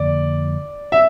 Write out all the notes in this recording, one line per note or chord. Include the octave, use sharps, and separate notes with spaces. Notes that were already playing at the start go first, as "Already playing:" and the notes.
Already playing: F2 D3 F3 A#3 D5
E5